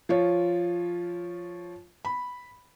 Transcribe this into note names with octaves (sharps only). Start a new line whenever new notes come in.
F3 F4 C#5
B5